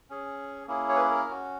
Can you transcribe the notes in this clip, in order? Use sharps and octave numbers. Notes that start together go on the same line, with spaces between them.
C#4 G#4
A#3 C#4 E4 G#4
C#5
B4
A#4
C#4
F#4